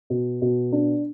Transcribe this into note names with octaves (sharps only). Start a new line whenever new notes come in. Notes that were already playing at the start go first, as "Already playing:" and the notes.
B2
B2
D4